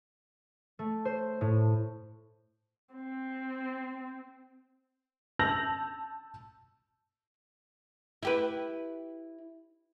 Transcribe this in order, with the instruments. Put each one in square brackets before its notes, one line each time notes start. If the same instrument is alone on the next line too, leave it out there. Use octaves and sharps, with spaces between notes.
[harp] A3
C5
A2
[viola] C4
[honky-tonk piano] A5 E6 G6 A#6 F7 F#7
[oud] E4 G4 B4